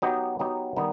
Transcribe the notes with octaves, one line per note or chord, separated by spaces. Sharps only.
F#3 B3 D#4 G4
F#3 B3 D#4 G4
D#3 G3 B3 D#4